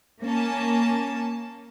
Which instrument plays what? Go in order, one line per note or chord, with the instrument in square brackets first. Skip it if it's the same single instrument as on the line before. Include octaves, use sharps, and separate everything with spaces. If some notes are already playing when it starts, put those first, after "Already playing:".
[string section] A#3 C#4 A5